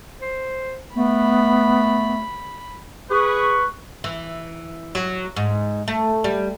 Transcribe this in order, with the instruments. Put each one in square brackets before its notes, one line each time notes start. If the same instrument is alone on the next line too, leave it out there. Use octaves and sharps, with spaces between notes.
[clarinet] C5
[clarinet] A3 [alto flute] B3 [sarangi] B5
[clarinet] G#4 [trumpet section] B4 C#6
[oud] E3
F#3
G#2
A3
G3